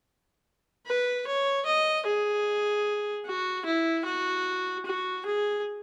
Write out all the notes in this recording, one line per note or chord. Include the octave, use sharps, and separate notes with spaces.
B4
C#5
D#5
G#4
F#4
E4
F#4
F#4
G#4